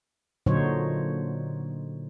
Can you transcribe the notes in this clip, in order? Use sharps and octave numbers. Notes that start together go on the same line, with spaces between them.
A#2 D3 F#3 D#4 C5 C#5